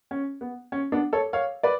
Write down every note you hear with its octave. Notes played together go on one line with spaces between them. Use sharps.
C#4
B3
C#4
B3 D4
A4 C#5
C#5 F5
B4 D5